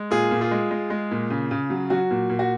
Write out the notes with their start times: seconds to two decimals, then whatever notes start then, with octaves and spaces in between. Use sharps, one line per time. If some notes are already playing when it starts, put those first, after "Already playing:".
Already playing: G#3
0.11 A#2 F4 G#4
0.31 A#2
0.41 F4 G#4
0.51 G#3
0.71 G#3
0.90 G#3
1.11 A#2
1.30 C#3
1.51 C#3
1.70 F#3
1.90 F#3 F#4
2.11 A#2
2.30 A#2
2.39 F#4